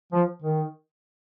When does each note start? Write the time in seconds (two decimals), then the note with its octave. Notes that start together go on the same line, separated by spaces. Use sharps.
0.12 F3
0.42 D#3